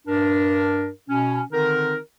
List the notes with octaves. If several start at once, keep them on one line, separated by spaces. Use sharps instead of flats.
G2 D4 A#4
B2 C#4
D3 D#3 C4 D#4 A#4